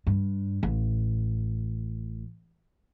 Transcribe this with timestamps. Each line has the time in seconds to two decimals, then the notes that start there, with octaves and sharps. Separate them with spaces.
0.07 G2
0.63 A1